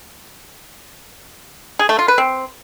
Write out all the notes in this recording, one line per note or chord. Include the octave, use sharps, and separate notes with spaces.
G#4
A3
F4
B4
C4